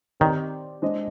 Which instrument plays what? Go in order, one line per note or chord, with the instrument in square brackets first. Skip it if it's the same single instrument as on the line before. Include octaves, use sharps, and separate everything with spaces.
[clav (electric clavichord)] D#3 [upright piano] C4 G4 D5
[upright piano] G#3 D4 G#4 C5 D#5